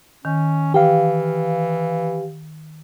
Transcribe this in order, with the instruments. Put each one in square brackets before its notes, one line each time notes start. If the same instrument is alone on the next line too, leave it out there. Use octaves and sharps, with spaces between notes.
[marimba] D#3 [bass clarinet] C#4
[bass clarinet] E3 [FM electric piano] G4 F5